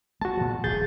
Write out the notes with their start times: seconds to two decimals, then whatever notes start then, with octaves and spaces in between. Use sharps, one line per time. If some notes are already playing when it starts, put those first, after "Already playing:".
0.21 G#3 F#4 A5
0.37 A#2 F3
0.64 D#1 G2 G#4 G6 A6